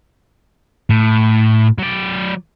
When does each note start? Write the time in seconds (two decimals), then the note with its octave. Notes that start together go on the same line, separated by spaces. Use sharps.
0.90 A2
1.79 F#3 D5